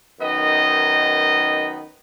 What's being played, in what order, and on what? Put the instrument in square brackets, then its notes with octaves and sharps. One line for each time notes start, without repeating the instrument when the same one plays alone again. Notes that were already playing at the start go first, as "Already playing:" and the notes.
[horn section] F#2 D#3 B3 D#4 D#5